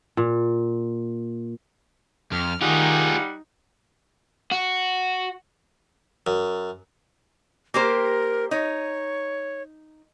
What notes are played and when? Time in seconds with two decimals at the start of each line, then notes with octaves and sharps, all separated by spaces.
0.17 A#2
2.32 F2 F6
2.62 D#3 G3 D#4 F4 G#4 F#5
4.52 F#4
6.27 F#2
7.74 A#3 G4 A#4 C5
8.51 D#4 C#5